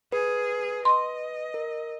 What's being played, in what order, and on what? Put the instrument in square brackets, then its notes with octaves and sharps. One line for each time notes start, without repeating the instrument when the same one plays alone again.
[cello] G#4 [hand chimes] B4
[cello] D#5 [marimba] C6
[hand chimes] A#4